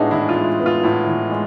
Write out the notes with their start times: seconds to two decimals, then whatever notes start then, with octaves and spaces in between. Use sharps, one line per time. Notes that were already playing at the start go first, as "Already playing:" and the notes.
Already playing: A2 G#3 B3 D4 D#4 F#4 G#4
0.11 E3 E4
0.29 F4
0.36 G#3
0.60 B3
0.66 F4
0.83 A2 E4
1.07 E3
1.31 G#3